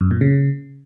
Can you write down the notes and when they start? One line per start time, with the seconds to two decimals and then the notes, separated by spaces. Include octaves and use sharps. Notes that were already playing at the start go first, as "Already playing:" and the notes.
0.01 F#2
0.11 A#2
0.21 C#3